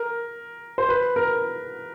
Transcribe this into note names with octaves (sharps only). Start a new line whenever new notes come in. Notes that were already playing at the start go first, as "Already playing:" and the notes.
Already playing: A#4
C5
B4
A#4